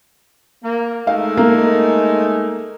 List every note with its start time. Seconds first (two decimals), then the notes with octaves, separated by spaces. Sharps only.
0.63 A#3
1.07 G#3 A3 D#4 F5
1.37 A#3